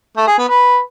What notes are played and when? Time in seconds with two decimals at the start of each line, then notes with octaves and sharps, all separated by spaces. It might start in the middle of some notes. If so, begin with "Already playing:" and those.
0.17 A3
0.28 G#4
0.38 B3
0.49 B4